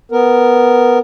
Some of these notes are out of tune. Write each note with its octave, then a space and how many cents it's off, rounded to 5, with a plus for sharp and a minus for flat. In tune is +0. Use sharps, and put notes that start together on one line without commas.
B3 +0 A#4 +0